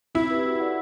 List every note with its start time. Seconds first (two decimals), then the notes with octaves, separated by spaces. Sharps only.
0.15 C4 E4
0.31 G4 B4
0.45 F#4
0.60 A4 D5 F#5